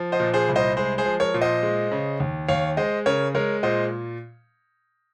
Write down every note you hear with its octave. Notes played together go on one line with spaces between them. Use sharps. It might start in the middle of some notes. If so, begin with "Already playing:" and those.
Already playing: F3
C5 D#5
A#2
G#4 C5
C2
C5 D#5
G#3 G#4 C5
G#4 C5
F3
A#4 C#5
A#2
C5 D#5
G#3
C#3
D#2
D#2 C#5 F5
G#3 C5 D#5
C#3 A#4 C#5
G#3 A#4 C#5
A#2 C5 D#5